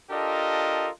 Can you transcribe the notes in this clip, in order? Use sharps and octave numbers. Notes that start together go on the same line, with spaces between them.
D4 F4 G4 A4 A#4 D#5